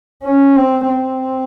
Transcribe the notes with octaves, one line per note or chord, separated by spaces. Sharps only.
C#4
C4
C4